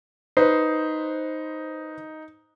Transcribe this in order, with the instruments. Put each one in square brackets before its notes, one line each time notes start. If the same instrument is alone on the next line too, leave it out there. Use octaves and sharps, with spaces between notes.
[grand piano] D#4 [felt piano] B4 C5